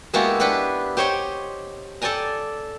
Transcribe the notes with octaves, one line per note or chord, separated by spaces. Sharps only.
G#3 A#3 B3 E4 F#4 G4
D4 G4 B4 F#5 B5
G4 C5 C#5 D#5 G5
A4 D5 G5 G#5 A#5